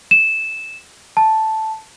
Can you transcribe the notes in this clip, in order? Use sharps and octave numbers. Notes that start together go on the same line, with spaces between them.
E7
A5